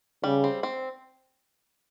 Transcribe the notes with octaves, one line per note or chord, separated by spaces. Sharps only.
C#3 G3
C4
C4